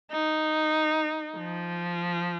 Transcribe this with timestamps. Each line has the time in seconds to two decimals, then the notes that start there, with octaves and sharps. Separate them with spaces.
0.12 D#4
1.38 F3